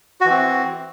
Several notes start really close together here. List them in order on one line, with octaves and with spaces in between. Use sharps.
F#4 E3 C4